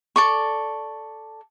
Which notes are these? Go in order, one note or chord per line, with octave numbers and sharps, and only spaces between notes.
A4 D5 C#6